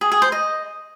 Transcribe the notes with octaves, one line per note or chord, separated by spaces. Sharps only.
G#4
G#4
C5
D#5